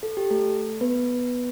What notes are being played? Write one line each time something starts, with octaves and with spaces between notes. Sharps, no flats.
A4
G4
A3 A4
B3 B4